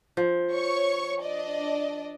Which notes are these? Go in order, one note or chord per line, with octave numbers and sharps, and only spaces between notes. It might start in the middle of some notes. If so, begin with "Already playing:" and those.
F3
C#5 C#6
D4 D5 D#5